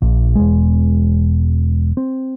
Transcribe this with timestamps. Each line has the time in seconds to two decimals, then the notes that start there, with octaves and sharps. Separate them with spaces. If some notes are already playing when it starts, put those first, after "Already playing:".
0.02 A#1 A#2
0.35 E1 G#3
1.97 C4